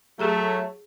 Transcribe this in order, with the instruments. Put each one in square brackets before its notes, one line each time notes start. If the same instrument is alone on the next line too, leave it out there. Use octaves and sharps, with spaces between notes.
[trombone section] F#3 A3 [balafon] G4 G#4 A#5